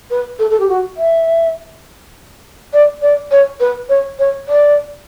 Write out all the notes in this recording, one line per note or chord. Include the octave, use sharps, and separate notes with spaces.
B4
A4
A4
G4
F#4
E5
D5
D5
C#5
B4
C#5
C#5
D5